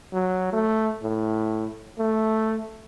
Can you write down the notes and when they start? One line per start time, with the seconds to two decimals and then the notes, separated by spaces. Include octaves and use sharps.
0.13 F#3
0.53 A3
1.03 A2
1.99 A3